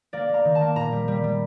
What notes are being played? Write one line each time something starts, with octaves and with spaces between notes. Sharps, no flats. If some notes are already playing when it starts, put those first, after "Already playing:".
A#3 D5
A#3 A#5
D#3
A5
A#3
A#2 A#5
G3
G3
G3